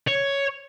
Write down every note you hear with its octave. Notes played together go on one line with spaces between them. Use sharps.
C#5